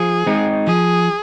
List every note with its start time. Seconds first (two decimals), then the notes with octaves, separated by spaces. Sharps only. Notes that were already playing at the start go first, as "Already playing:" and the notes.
Already playing: F3 G#4
0.27 G#3 C4 D#4
0.67 F3 G#4